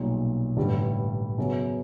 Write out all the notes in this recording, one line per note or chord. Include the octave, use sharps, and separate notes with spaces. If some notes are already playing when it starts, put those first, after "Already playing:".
Already playing: B1 A#2 G3
A1 G2 D3 G3
F#2 C#3 F#3 B3